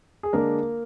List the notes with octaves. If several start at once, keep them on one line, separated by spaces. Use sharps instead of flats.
G#4
D3 G#3 A#3 D4 A#4